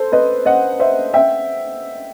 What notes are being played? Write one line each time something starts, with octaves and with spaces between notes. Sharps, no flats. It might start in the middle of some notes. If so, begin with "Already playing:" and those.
Already playing: A4 C5
B4 D#5
D#5 F#5
C5 E5
E5 G5